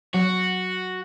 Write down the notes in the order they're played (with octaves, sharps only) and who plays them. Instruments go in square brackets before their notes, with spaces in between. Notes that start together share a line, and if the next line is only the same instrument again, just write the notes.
[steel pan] F#3 [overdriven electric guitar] F#4